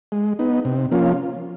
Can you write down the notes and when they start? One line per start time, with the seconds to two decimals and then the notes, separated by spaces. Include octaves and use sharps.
0.12 G#3
0.39 B3 D#4
0.65 C3
0.91 F3 A#3 C#4 F4